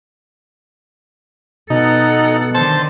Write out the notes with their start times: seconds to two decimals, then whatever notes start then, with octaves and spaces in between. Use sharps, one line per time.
1.70 B2 D#4 A4 F#5
2.55 D3 D#3 C5 A5